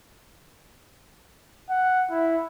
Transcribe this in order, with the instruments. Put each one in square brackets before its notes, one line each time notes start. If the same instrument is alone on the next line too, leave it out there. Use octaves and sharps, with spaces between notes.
[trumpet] F#5
E4